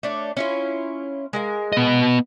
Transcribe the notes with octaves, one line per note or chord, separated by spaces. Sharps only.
A3 D4 C#5
C#4 E4 F4
G#3 A#4 F5
B3 D#5